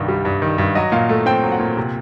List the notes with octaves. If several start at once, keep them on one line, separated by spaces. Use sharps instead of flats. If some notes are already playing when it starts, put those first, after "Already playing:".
Already playing: C2 G2 D#3
G3
G2
D#3
G2
F#3 D#5
A#2 F5
A3
C4 G5
F#3
F#5
A#2
C3